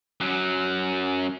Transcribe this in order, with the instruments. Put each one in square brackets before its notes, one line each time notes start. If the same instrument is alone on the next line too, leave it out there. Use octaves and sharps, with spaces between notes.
[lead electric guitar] F#2 F#3